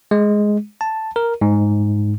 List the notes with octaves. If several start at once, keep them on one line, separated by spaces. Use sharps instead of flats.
G#3
A5
A#4
G#2